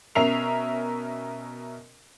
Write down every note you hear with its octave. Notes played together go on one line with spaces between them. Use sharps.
B2 C#4 A#4 E5 C7 F7